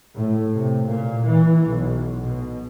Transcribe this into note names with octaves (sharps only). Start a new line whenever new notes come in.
A2
C3
A#2
E3
B1
B2